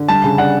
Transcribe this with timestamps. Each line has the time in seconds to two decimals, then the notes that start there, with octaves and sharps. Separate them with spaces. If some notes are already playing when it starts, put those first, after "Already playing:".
Already playing: D3
0.08 G3 A5
0.24 C#3
0.38 D4 F#5